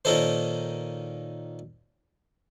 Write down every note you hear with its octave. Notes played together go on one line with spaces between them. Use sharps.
A#2 D#3 C#4 D#4 A4 C5